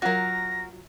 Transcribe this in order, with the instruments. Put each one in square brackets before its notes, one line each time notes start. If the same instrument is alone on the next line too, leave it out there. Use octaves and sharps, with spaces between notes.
[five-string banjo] F#3 F4 [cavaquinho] F#4 A#4 [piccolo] A#6